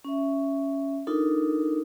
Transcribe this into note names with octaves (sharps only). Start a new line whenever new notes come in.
C#4 E5
D4 D#4 F4 A4 A#4